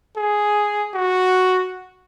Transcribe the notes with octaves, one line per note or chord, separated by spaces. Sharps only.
G#4
F#4